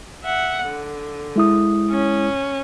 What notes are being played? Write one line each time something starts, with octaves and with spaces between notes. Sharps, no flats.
E5 F#5
D3
G#3 E4 D#6
C#4